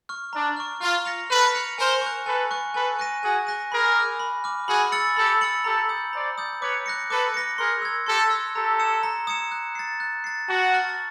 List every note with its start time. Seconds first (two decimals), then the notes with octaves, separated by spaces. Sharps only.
0.09 C#6 F6
0.33 D4 A#5
0.57 C#6 F6
0.81 F4 F6
1.05 A#6 C#7 F7
1.29 A4 B4 F6
1.54 A#6 C#7 F7
1.77 A#4 C5 G#5
2.01 C#6 F#6
2.26 A4 B4 G#5
2.51 C#6 F#6
2.74 A4 B4 G#5
2.99 C#6 F#6 A#6 D#7
3.22 F#4 G#4 G#5
3.47 C#6 F#6 A#6 D#7
3.72 G#4 A#4 B5
3.96 D6 F6
4.20 B5
4.44 D6 F6
4.68 F#4 G#4 B5
4.92 E6 A6 C#7 F#7
5.16 G4 A4 B5
5.41 E6 A6 C#7 F#7
5.64 G4 A4 A#5
5.89 D#6 G6
6.13 C5 D5 A#5
6.38 D#6 G6
6.61 B4 C#5 D6
6.86 F#6 A#6 C#7
7.09 A4 B4 D6
7.34 F#6 A#6 C#7
7.58 G#4 A#4 C6
7.82 E6 G#6
8.06 G4 A4 C6
8.30 E6 G#6
8.55 G4 A4 A#5
8.80 D#6 G#6 C#7 E7
9.03 A#5
9.27 D#6 G#6 C#7 E7
9.52 F#6
9.75 A6 C7
10.00 F#6
10.24 A6 C7
10.48 F#4 A5
10.73 C#6 F6 A6